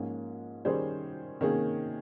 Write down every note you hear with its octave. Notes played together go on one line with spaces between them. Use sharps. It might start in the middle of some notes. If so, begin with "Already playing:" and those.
Already playing: G#2 F3 A#3 C#4 F4
D#3 G3 C#4 G#4 C5
C3 D#3 A#3 C#4 G#4